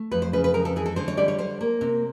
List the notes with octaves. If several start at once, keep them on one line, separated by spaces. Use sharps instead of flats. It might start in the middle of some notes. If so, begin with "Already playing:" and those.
Already playing: A3
F2 B4
C5
C#3 B4
B4
F2 A#4
A4
E3 G#4
A4
D3 C5
C#5
G3 D5
C#5
D3 C5
A#3
C3